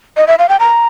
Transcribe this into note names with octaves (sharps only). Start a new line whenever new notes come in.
D#5
E5
F5
G5
A#5